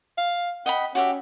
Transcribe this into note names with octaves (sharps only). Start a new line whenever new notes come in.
F5
D#5 F#5 G5 B5
C#4 F#4 G4 E5